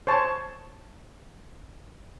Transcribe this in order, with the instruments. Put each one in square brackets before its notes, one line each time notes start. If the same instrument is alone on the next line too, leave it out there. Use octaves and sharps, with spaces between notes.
[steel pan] C5 C#5 A5